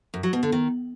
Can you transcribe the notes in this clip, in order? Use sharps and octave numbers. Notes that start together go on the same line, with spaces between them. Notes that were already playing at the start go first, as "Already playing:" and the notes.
F#2
F#3
B2
D3
D#3